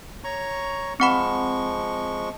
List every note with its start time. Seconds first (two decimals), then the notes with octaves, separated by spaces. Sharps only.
0.24 C#5 A#5 C#6
1.00 F3 G#3 C4 F#5 B5 C#6